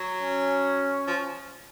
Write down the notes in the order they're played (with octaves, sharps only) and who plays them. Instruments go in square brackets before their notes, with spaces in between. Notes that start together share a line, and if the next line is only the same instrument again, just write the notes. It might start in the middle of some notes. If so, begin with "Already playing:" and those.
Already playing: [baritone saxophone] F#3
[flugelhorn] C#4
[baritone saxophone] F3